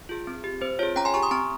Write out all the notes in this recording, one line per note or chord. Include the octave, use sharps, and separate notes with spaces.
F4 G#4
C4
G4
C4 C5
F4 G#4 C#5
C#4 G5 A#5
G#5 C6
G4 A#5 C#6
C6 D#6
C4 A#5 C#6